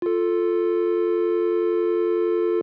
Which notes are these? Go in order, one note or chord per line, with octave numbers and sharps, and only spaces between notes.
F4 A4